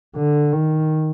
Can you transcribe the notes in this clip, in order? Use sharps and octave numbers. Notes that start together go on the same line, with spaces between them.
D3
D#3